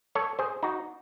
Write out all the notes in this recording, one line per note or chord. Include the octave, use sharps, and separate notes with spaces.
A4 C#5
G#4 C5
D#4 F#4